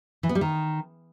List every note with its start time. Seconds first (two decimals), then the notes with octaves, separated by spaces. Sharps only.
0.23 E3
0.29 B3
0.35 G3
0.41 D#3